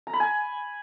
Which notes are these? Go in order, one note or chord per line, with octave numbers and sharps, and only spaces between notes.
A#5
B5
G#5